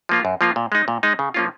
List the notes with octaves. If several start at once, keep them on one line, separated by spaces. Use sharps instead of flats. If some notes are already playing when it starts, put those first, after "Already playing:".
F3 A#3 F4
F#2
F3 A#3 F4
A#2
G#3 D#4
A#2
G#3 D#4
C#3
F3 A#3 C#4 F4